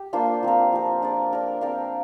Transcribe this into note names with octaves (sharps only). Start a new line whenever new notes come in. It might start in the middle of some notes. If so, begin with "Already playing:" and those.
Already playing: G4
A#3 D4 F4 C5
F3 C4 A#4
F3 C4 A#4
D4 A#4 D5
D4 A#4 D5
C4 A#4 D5 F5